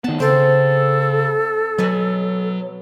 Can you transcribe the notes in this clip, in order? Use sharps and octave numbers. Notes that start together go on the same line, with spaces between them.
D#3 B3 A5
C#3 C4 A4 C5
B2 F#3 D#5 G#5